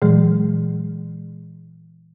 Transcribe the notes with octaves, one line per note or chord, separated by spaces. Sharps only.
A#2 E3 F#3 G#3